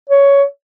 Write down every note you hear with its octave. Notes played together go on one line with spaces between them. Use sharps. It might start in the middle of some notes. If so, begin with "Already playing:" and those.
C#5